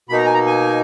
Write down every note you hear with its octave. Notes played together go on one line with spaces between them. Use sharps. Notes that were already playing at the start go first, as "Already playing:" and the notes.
B2 A#3 D#4 B5
A#5
G#5
A#5
G#5